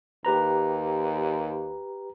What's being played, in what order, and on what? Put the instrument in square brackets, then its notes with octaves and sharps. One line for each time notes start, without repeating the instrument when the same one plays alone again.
[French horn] D#2 [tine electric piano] G4 B4 A#5